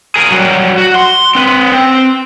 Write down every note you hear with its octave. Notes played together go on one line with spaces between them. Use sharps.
G#4 A#4
F#3 G3
F#4
C6
C4 B4
C4